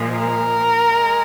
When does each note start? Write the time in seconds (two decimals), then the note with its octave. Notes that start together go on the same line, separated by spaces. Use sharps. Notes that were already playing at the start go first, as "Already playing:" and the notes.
Already playing: A#2 F3 G#3
0.16 A#4
0.93 G#3